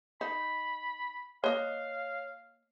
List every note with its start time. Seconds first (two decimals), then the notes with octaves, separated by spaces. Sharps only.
0.21 D#4 B5
1.44 A#3 C#5 D#5 F5